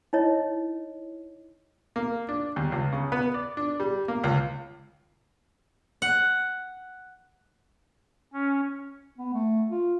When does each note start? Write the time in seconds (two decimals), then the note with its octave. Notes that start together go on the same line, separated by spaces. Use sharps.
0.13 D#4 E4 C#5 D#5
1.96 A#3
2.29 D4
2.56 D#2
2.72 C#2
2.92 C#3
3.12 B3
3.34 D5
3.57 D4
3.80 G3
4.08 A#3
4.24 C#2
6.02 F#5
8.33 C#4
9.18 B3
9.34 A3
9.71 F4